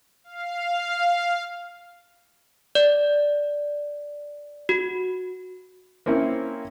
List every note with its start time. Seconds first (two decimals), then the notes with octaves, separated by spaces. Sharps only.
0.24 F5
2.75 D5
4.69 F#4
6.06 A#3 C4 C#4 E4